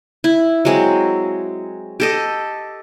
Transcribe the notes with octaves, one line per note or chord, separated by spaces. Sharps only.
E4
F#3 G#3 C4
G4 A4 D#5